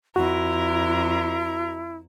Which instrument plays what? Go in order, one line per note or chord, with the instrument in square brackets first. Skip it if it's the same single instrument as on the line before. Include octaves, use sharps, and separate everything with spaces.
[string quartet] F2 A#4 [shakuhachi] E4 [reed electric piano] F#4